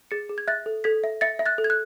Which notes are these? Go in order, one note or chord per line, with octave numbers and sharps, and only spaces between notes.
G#4 A6 C#7
G#4
G#6
E5 F#6 A6
A4
A4 G#6 B6
E5
E5 A6 C#7
E5
F#6 A6
A4
G#6
F#6